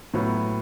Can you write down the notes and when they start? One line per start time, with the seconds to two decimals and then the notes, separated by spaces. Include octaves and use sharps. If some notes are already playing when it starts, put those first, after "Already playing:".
0.14 A2 F#3 B3